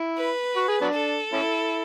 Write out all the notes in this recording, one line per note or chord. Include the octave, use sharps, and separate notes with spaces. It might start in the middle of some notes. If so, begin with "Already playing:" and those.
Already playing: E4
B4
F#4
G#4
F#3 B3 D4
A4
A3 C#4 E4